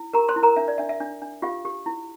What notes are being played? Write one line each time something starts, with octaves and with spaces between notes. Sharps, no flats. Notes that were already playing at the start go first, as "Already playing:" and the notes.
Already playing: E4
G4 A#4 A#5
C5 C6
E4
A#4 A#5
D4 E5
D5
D4 E5
E5
D4
D4
F4 G4 F5
G4
E4